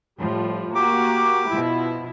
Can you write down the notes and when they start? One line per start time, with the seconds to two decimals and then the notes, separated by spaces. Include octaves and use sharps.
0.20 A2 F3 G3
0.75 A#3 F#4 G4 D6
1.49 B2 F3 E4